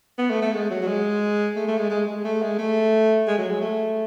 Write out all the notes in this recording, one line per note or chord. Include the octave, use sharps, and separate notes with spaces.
B3
A3
A3
G#3
F#3
F#3
G#3
A3
A3
G#3
G#3
G#3
A3
G#3
A3
G#3
F#3
G#3
A3